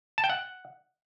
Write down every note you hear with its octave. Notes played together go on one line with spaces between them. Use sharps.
A5
G5
F#5